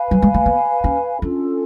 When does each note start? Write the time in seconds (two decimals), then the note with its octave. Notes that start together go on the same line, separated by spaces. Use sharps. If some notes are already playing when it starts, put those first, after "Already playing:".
Already playing: B4 F5 G#5 B5
0.11 F#3
0.22 G#3
0.34 A3
0.46 B3
0.84 C#4
1.22 C#4 D4 F4 A4